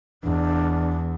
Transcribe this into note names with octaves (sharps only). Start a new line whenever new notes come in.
E2 D4